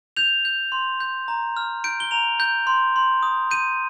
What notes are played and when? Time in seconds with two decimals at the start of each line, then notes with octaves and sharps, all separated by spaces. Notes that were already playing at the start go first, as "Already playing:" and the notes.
0.17 G6 F7
0.45 G6
0.72 C6
1.00 G6
1.28 A#5
1.57 F6
1.84 G6 D7
2.00 G7
2.11 A#5 F7
2.40 G6
2.67 C6
2.96 C6
3.23 D#6
3.51 G6 D#7